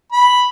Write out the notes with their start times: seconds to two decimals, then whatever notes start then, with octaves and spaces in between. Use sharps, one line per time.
0.12 B5